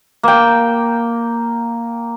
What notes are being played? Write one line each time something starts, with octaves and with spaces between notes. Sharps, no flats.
A#3 G5